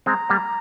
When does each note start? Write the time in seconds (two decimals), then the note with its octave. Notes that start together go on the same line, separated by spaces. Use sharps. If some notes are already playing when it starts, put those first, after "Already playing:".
0.06 G#3 C4 A#5
0.29 G3 A#3